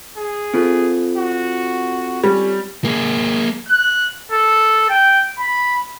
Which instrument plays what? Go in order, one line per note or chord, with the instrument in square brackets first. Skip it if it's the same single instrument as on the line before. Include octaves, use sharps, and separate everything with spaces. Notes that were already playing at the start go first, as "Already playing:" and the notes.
[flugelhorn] G#4
[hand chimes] C4 F4 A4
[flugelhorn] F#4
[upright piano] G3 [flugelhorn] C#4
[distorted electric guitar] A#3 G#4
[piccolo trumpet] F#6
A4
G5
B5